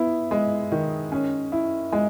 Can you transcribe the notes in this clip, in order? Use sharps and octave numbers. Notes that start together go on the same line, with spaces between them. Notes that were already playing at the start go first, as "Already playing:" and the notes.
Already playing: B3 E4
G#3
D#3
C#4
E4
G#3